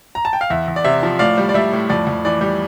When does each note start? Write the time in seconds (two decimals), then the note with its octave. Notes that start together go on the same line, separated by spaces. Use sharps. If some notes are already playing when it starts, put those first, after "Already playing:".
0.15 A#5
0.25 A5
0.33 G5
0.41 F5
0.50 E2 E5
0.68 E2
0.76 D5
0.84 C3 E5
1.03 F3
1.19 A2 D5 F5
1.38 G3
1.49 D5
1.54 G3 E5
1.72 A2
1.90 F2 D5
2.07 F2
2.25 E3 D5
2.41 G3